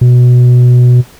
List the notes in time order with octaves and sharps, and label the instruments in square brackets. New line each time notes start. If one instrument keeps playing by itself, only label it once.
[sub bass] B2